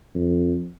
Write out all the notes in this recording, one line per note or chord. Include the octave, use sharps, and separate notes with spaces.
F2